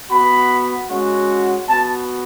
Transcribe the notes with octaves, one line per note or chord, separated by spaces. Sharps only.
B3 F#4 B5
G#3 C#4 F#4
B3 F#4 A5